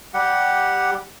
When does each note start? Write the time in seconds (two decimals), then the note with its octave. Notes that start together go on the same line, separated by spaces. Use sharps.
0.14 G3 G4 F#5